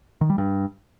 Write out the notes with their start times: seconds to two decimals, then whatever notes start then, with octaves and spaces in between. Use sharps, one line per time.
0.21 D#3
0.30 G3
0.38 G2